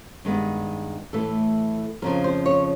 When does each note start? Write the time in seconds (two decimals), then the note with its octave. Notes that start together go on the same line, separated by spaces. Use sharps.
0.25 G2 D#3 G#3 B3
1.13 A2 E3 A3 A4
2.02 F2 C#3 F3 A#4
2.24 C5
2.46 C#5